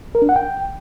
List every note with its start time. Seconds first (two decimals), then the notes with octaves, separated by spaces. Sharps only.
0.15 A#4
0.22 D4
0.29 F#5
0.36 G5